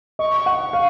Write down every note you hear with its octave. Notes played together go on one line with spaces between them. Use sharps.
D#5 C#6
F#5
F5